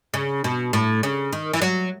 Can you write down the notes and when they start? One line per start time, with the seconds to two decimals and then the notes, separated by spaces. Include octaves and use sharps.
0.14 C#3
0.44 B2
0.73 A2
1.03 C#3
1.32 D#3
1.53 E3
1.62 F#3